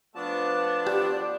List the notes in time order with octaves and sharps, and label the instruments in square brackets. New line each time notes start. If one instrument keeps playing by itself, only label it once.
[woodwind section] F3 A3 D4 [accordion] B3 A5
[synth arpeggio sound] G4 [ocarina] D5